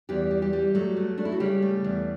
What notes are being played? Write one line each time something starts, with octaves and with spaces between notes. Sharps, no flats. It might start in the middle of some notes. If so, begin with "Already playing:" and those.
E2 G3 G4
G3
G3 G4
G3
F#3 A3 F#4
A3
A3 D4
E4
F#4
C#3 G3 G4
A3
E2